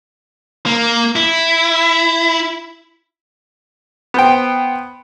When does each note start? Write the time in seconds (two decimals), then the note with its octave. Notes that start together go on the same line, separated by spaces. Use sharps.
0.66 A#3
1.16 E4
4.14 B3 C5 G5